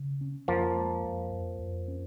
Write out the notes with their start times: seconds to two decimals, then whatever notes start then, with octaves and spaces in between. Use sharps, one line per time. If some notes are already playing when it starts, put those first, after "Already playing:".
Already playing: C#3
0.21 C#4
0.48 F2 F3 A#3
0.76 G#3
1.05 F2
1.32 F2
1.60 F2
1.88 C#4